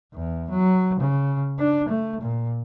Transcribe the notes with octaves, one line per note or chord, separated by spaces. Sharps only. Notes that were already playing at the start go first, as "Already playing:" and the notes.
E2
F#3
C#3
D4
A3
A#2